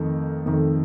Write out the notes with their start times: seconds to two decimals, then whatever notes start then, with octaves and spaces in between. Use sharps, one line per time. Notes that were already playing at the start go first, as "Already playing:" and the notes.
Already playing: F2 D#3 A3
0.46 F2 D#3 A3